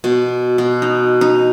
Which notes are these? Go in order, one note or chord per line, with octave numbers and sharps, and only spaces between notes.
B2
B2
D#4
D#4